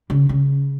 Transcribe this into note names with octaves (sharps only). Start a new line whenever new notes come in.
C#3
C#3